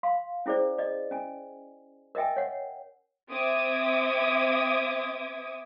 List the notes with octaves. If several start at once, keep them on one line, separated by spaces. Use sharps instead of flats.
F5 C6
C#4 E4 G#4 C5 D5
D5 D#5
C#4 G#5
A#4 D#5 E5 G5 G#5
C#5 F#5
C4 E5 D6 D#6 G#6